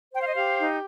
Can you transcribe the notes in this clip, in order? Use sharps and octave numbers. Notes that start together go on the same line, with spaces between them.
C5 G5
F5
D#5
G4 F5
D#4